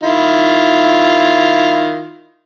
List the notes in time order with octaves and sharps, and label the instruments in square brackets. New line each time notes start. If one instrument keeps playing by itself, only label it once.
[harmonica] D#3 E4 F4